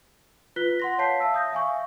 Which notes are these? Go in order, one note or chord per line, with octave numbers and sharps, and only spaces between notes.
F4 B4 F#6 B6 G7
F#5 C6 A#6
C#5 F5 A5 G6 B6 C7
E5 F5 A5 E6
D#6 G6 A#6
E5 F5 G#5 C#6